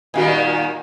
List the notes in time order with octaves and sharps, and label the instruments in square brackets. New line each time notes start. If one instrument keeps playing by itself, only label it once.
[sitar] A#2 D#3 G3 [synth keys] F#4 F5 G#5